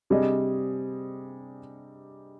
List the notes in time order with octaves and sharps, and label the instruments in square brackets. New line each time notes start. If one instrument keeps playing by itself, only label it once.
[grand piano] C3 G3 D4 G#4 D#5